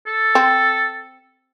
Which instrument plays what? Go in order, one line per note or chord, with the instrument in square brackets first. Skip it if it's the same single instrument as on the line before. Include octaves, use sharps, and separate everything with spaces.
[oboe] A4
[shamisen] C4